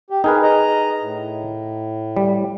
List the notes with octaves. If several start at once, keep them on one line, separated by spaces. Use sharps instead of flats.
G4
D#4 G#4 A#4 B4
D#5 A#5
A2
G3